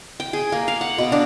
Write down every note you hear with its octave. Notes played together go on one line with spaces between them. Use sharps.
G5
G#4
A#3
F5
F#5
B2
D4